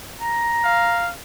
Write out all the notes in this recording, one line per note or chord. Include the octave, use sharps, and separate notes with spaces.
A#5
F5